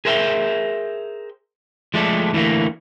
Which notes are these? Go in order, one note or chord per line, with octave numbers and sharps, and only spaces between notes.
G#4 A#4 C5 E5 F#5 G5
F3 G#3 A3 A4 D5
D2 E3 G3 A3 A#3